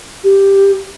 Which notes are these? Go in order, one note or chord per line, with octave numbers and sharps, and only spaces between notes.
G4